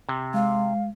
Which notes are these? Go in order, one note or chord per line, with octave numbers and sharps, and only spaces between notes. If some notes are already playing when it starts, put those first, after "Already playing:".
C3
G#3 F5